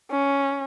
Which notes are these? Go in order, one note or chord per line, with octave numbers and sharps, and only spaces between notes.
C#4